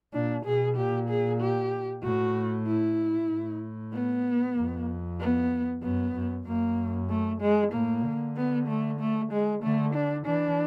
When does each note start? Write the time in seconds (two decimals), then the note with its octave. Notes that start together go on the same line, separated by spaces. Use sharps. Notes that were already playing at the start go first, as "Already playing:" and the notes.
0.13 A#2 D4
0.46 B2 G#4
0.77 A#2 G4
1.09 G#4
1.41 G4
2.03 A2 F#4
2.67 E4
3.30 A2
3.93 B3
4.57 F2
5.20 B3
5.83 F#2 B3
6.15 F#2
6.47 F#2 A#3
7.09 A3
7.41 G#3
7.73 A2 A#3
8.05 D3
8.36 B3
8.68 A3
9.00 A3
9.32 G#3
9.63 D3 A3
9.94 D4
10.26 E3 D4